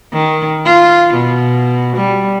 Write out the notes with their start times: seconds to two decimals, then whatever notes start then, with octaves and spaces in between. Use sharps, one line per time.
0.13 D#3
0.66 F4
1.14 B2
1.96 G3